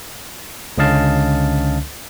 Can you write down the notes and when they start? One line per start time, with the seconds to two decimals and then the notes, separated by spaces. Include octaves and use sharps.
0.78 C#2 D3 C#4 D#5 F5 A5